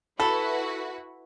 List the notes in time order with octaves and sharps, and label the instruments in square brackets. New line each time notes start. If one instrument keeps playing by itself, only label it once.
[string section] E4 F#4 B4 [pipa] A4 [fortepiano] B5